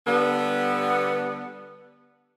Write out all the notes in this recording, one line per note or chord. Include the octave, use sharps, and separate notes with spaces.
D3 G3 B3